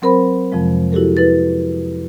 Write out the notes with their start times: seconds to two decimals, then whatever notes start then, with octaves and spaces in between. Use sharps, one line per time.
0.02 F#3 C4 A#4 C5 B5
0.52 F2 C3 F3 G#3
0.92 E4 F#4 G4 A4 A#4
1.17 E4 B4 A6